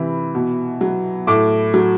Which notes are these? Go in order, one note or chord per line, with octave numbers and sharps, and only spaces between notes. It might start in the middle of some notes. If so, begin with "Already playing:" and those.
Already playing: C3 E3 B5
B2
F#3
A2 D6
F#3